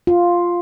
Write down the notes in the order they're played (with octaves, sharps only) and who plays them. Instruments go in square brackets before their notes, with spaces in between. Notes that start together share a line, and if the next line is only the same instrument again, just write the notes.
[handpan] F4